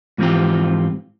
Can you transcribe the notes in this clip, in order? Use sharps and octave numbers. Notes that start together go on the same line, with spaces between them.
G#2 E3 F3 C4 F4 G4